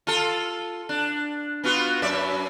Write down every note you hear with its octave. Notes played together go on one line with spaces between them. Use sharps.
F4 A4
D4
B3 F4 F#4
F#2 D5 E5